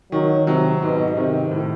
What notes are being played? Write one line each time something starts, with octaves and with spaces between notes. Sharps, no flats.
D#3 F#3
C3 F#3
G#2 B2
C3 D#3
A2